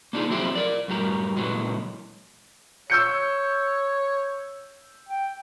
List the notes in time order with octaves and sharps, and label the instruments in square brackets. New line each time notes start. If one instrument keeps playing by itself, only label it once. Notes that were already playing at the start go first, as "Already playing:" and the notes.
[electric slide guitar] A#3 D4 D#4 F4 G#4
F3 F#3 G#3 C4 E4 G4
A#4 D5
F#2 A2 F#3 G3 A#4
A#2 C#3 E3 F#3 G#3
[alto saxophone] C#5 [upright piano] E6 G6 C#7
[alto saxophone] G5